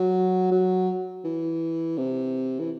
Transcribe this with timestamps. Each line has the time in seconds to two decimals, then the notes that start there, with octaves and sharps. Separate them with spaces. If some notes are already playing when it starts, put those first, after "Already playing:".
Already playing: F#3
0.51 F#3
1.24 E3
1.97 C3
2.59 E3